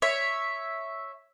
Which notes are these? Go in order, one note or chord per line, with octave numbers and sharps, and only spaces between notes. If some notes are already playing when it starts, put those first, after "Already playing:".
C#5 E5